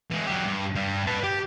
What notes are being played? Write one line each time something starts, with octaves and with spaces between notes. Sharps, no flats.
E3 G#3
F#3 G4
G2
G2 G3
B4 A5
G4